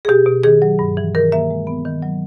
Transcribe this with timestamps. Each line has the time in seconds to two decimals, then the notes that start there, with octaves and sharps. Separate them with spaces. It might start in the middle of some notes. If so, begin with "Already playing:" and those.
0.05 G#4
0.08 B2 G4
0.26 B2
0.44 D#3 G#4
0.62 F#3
0.79 G2
0.97 E3
1.15 D#3 A#4
1.32 A#3 E5
1.50 G#3
1.67 B3
1.85 D#3
2.02 F#3